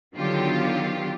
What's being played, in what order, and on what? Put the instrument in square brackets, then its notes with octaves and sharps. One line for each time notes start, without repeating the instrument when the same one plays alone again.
[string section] D3 D#3 F#3 B3 F4 G4